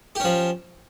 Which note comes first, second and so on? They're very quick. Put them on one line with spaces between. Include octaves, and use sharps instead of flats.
G4 C#4 F3